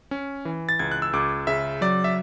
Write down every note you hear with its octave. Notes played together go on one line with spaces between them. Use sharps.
C#4
E3
A6
C#2 G#6
F#6
E6
C#2 D6
C#3 E5
F#3 D5
E5